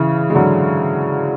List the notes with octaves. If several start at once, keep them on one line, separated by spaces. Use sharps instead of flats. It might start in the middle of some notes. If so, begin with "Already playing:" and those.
Already playing: C#3 E3
G#3
D3 F#3